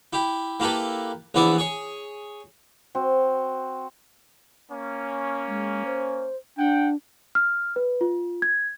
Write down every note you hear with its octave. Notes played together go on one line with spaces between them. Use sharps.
E4 G4
A#3 E4 G4 A4 B4
A#1 E3 B3 E4 D5 E5
G#4 C#5
C4 F#4
A#3 C#4
G#3
C5
D4 F#5 G5
F6
B4
F4
G#6